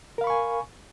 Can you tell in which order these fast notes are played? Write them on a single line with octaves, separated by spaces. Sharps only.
A#4 F5 B5 C#6 G#5